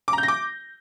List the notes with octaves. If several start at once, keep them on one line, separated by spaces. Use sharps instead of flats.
D6
A#5
G6
A#6
D6